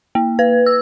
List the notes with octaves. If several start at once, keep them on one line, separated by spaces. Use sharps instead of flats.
A#3
B4
E6